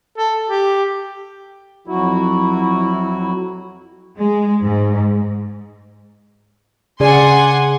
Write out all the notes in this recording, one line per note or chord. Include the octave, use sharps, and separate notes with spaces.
A4
G4
F2 F#3 E4 F#4
G#3
G#2
C#3 G#4 D5 F#5 G#5 C6